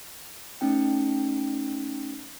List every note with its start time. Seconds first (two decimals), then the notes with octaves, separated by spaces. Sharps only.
0.61 A3 C#4 D#4 G5